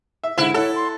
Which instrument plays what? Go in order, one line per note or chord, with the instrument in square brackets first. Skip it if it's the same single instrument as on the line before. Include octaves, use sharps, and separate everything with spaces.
[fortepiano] E5
[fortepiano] G#2 D3 [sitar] E4 [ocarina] C5
[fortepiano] E4 F#5 [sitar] A4 [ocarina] C#5
[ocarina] C6